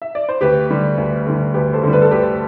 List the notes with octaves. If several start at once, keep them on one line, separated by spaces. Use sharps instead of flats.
E5
D5
C5
D2 G4 B4
D3 G3
D2
D3 G3
D2 G4 B4
A4 C5
D3 G3
B4
A4
D2 G4 B4